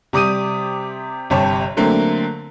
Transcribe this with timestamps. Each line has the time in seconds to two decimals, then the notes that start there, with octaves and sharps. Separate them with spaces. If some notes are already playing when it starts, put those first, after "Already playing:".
0.13 C3 G3 D6 D#6 D#7
1.30 G1 C3 G4 C#5 A5
1.77 D3 F#3 A3 A#3 C4